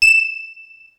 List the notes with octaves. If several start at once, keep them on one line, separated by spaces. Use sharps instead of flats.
E7